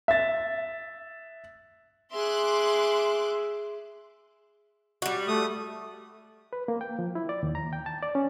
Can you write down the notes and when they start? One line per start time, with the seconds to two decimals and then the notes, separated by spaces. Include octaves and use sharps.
0.08 E5 A6
2.12 G#4 E5 C6 D6 F#6
5.02 G3 F#4
5.28 A3 D#6
6.53 B4
6.68 A#3
6.81 G5
6.99 F3
7.15 E4
7.29 D5
7.43 D#2
7.55 A#5
7.73 G5
7.86 A5
8.03 D5
8.15 C#4